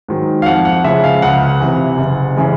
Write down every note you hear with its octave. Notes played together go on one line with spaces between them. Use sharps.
G#2 D#3 F#3
F5
F2 F#5
F#5
C#3 F3 G#3 E5
F5
C#2 F#5
C3 E3
F#1
C#3 E3 G#3